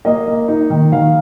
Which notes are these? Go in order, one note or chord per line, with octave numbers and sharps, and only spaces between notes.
A#3 D#5
A#3
D#4
D#3
D#3 F5